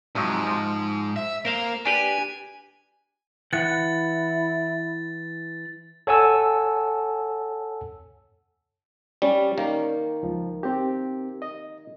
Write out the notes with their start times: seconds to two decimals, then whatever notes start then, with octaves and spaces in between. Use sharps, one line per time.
0.15 G#2 C3 F3 F#3
0.47 F3
1.16 E5
1.45 A#3 A#4 C5 F5
1.86 D4 G4 B4 G#5
3.53 E3 E4 F#5 A6
6.07 A4 C#5 F#5 G#5 A5 E6
9.22 G3 C#4 C#5 D5
9.58 D#3 A#3
10.23 C#2 F3
10.63 C4 G4
11.42 D#5